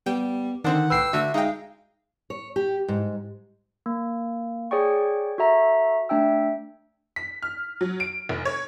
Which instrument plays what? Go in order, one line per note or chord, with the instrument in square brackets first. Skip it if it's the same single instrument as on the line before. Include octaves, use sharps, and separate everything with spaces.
[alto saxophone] G3 [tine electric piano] B3 [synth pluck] G5
[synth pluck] D3 C4 D4 [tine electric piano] D#3 [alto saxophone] F#5
[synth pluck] C2 A2 [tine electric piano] B4 G5 C7 [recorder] E6
[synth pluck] D3 A3 [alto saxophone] F#4 [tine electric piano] E5
[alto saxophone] G#3 [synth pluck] D#4 G5 [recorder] F5
[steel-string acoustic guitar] C#5
G4
G#2
[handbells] A#3
G#4 C#5 D5 G5 C#6
F#4 A4 E5 A#5
A3 D4 E5 G5 E6
[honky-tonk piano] B6
F6
F#3
D7
F1
C#5